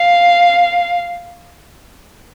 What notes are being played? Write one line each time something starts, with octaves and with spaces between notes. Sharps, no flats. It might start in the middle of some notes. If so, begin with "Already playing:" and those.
Already playing: F5